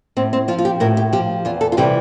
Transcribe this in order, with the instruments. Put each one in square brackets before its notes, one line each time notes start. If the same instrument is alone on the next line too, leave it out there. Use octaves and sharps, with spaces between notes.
[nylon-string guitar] A2 C4
C4
F3 F4
F4
G4
A2 A#4
G4
F3 G4
E2 F4
A4
F4
C3 E3 G3 G4